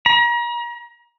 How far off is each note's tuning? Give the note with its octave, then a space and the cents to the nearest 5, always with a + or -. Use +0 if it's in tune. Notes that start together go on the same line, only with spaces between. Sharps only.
A#5 +35